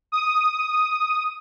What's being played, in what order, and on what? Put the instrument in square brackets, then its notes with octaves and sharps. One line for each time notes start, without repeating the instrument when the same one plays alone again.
[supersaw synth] D#6